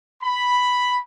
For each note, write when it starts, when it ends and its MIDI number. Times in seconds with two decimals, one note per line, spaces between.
0.23 0.99 83